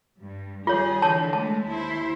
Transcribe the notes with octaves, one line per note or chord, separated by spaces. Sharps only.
G2
D#3 G3 F4 G#4 C#5
D3 E3 C#5 A5
G#3 A3 A5
D#2 E4 C5